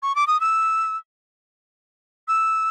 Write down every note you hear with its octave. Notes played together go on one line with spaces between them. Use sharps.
C#6
D6
D#6
E6
E6